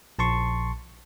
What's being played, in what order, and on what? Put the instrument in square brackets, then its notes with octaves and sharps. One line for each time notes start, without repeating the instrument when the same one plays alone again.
[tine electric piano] A#1 A5 C6 C#6